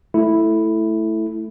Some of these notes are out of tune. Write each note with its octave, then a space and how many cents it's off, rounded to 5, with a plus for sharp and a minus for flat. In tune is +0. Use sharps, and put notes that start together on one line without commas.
A3 +0 E4 +0 A4 +0